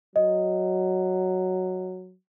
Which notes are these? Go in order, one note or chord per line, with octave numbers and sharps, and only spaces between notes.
F#3 D#5